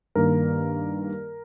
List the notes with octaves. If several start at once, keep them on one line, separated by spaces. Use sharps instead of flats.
G2 D#3 A#3 A#4